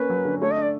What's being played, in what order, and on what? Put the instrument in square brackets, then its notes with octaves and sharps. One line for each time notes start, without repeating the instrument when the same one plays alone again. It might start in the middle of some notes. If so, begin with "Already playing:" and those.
Already playing: [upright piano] A#3 C#4 [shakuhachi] B4
[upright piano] F#3
D3
[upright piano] A3 [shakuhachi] C#5
[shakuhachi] D#5
[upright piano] D4
[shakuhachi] D5